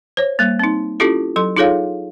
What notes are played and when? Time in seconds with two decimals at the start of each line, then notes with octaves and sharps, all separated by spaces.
0.17 C5 C#5
0.39 G3 A#3
0.59 C4 D#4
1.00 C#4 E4 F4 G4 A4
1.36 F#3 A4 C6
1.57 D#4 F4 G#4 A4 C#5 F5